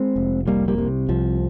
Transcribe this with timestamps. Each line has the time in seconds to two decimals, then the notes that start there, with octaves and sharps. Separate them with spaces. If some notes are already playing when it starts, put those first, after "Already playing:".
Already playing: G#3 C4
0.16 F1
0.47 C2 G3 A#3
0.68 G3 A#3
0.78 C3
1.09 C2 F3